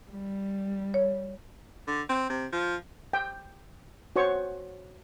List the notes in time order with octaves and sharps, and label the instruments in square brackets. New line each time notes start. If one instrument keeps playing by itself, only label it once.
[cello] G3
[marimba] C#5
[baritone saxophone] D3
C4
C3
F3
[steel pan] G5
F#4 C5 C#5 C#6